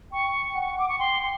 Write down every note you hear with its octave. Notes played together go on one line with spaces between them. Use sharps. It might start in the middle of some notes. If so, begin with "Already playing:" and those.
G5 C#6
F#5
D6
C#6
G5 C6
C6